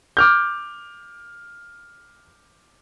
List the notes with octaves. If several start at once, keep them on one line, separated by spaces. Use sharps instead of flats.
D6 F6 G6